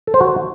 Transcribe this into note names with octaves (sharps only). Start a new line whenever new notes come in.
A4
C5
F#4